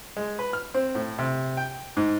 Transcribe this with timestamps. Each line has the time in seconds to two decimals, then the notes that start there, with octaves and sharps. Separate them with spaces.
0.17 G#3
0.39 B4
0.53 F6
0.74 C4
0.95 A2
1.19 C3
1.57 G5
1.97 G#2